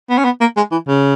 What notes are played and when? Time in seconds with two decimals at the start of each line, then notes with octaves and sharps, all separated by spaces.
0.10 B3
0.18 C#4
0.24 B3
0.40 A#3
0.57 G#3
0.72 E3
0.87 C#3